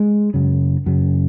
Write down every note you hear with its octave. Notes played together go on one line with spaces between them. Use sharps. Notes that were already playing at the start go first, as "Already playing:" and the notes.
Already playing: G#3
F#2 C#3
F#2 C#3